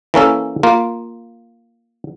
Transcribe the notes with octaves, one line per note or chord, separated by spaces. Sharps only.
E3 A#3 C#4 A4
A#3 F4